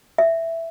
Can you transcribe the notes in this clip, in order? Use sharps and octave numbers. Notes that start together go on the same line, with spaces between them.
E5